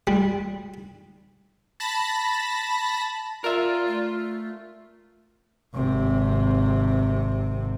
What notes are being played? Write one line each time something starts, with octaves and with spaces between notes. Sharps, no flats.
G3
A5 B5 A#6
F4 A#4 D5 E5
A3
G#1 C3